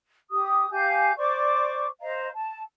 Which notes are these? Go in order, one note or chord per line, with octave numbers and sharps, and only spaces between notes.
G4 D#6
G4 F5 G#5 G6
C5 D5 C#6 D6
C5 D#5 F5 A#5
A5